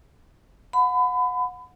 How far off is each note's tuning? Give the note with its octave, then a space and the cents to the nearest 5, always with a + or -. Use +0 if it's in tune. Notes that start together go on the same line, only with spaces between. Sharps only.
F#5 -30 B5 +30